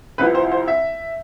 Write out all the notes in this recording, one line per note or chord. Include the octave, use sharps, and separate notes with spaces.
C2 C3 F3 C4 E4 B4
C5
C5
E5